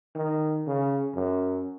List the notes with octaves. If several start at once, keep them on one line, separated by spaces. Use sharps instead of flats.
D#3
C#3
F#2